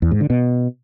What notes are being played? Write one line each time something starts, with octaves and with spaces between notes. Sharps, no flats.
E2
G#2
D3
B2